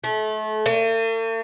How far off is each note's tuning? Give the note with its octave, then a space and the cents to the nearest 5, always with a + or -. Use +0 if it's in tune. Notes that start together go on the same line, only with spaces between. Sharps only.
A3 -30
A3 +45